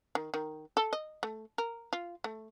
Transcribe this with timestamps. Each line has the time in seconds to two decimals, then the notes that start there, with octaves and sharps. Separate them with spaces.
0.15 D#3
0.34 D#3
0.77 A4
0.93 D#5
1.23 A3
1.58 A#4
1.93 F4
2.24 A3